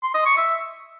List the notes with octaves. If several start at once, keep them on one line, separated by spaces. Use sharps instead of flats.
C6
D#5
C#6
E5